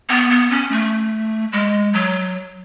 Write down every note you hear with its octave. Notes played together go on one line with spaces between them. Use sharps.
B3
B3
C#4
A3
G#3
F#3